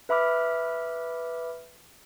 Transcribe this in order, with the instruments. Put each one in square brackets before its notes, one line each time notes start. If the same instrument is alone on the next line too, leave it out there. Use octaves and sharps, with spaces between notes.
[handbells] B4 E5 B5 D6 F6